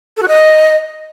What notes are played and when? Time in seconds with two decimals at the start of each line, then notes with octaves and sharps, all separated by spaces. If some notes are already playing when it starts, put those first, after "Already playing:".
0.17 A4
0.22 F#4
0.28 D#5